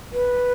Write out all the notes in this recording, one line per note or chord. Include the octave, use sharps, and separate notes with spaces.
B4